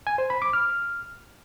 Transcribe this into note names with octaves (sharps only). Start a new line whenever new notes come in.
G#5
C5
B5
D6
F6